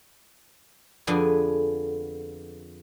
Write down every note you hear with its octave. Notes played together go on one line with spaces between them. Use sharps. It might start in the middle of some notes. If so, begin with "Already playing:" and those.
F2 D3 B3 G#4 G#5